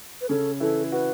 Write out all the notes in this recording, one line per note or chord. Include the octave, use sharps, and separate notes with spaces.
B4
C#3 C#4 A4
E3 E4 A4
F#4 B4